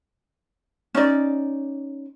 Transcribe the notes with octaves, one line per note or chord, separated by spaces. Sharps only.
C#4 D#4 D5